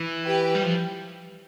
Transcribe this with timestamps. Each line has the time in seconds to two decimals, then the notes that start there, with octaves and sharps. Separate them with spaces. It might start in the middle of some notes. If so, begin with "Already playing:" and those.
Already playing: E3
0.25 G4 B4
0.55 G3
0.63 F3